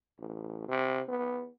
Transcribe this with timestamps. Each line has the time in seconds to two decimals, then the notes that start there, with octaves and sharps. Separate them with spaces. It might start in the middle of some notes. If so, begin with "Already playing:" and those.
0.19 A1
0.68 C3
1.09 B3